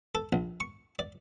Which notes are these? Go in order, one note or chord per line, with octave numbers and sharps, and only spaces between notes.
A4
A#1
C#6
D5